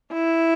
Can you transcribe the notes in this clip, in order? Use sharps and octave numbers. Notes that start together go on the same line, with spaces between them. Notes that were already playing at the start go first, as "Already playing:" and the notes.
E4